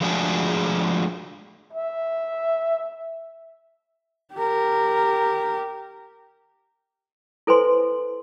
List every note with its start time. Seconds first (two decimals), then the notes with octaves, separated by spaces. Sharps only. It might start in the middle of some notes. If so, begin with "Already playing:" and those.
0.01 F3 G#3 A3 D4 F#4 G#4
1.73 E5
4.34 G4 A#4
7.47 E4 A4 B4 C5 G#5 C6